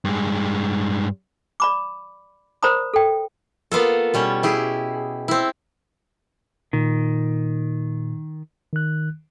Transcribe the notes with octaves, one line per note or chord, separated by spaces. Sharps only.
G2 G#3
D5 B5 D6
A#4 C5 D5 A#5 B5 D#6
A4 G5
A#3 B3 F4 A4
B2 G3 C#4
E4 G4 G#4
C4 E4
A#2 D#3
D#3 F#6